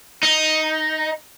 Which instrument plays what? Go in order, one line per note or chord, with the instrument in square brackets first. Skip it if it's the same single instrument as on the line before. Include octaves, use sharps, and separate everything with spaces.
[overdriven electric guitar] D#4